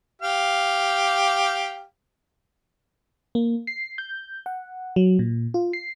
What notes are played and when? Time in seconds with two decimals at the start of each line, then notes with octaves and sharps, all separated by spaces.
0.21 G4 F5
3.35 A#3
3.67 C7
3.98 G6
4.46 F#5
4.96 F#3
5.19 A#2
5.54 F4
5.73 C7